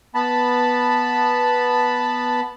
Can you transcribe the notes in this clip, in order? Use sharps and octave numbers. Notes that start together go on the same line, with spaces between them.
B3 A5 B5